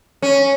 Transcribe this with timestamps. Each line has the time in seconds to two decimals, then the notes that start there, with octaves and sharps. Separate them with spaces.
0.22 C#4